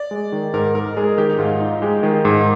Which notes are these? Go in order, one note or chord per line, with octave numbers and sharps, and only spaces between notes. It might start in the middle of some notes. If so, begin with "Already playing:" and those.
Already playing: D5
G#3
D#3
G#2 A#4
D#4 A#4
G#3 G#4
D#3 G4
D#4
G#2 F4
D#4 F4
G#3 G4
D#3 G#4
G#2 A#4